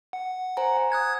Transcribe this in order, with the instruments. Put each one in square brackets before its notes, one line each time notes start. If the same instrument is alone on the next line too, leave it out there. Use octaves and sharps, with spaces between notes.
[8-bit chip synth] F#5
[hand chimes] C5 G#5 A#5
[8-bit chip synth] D#6 F#6 G#6